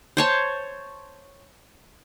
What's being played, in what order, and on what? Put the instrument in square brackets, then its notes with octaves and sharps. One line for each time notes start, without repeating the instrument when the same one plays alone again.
[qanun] C5 C#5 A5